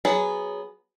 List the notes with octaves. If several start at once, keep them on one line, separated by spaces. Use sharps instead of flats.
F#3 B3 G#4